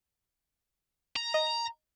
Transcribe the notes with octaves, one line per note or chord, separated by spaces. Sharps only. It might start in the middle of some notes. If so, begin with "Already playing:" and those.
A#5
D#5